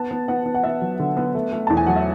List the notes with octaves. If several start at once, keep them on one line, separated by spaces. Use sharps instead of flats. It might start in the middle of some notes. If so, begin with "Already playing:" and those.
Already playing: B3 A5
B3
B3 F#5
B3
F#5
B3 E5
F#3
D3
B3
A3
A3
E2 A5
G#5
F#3 F#5
E5